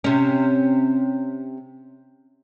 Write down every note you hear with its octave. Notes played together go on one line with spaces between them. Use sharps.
C3 C#4